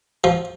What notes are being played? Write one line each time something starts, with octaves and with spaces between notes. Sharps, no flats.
F3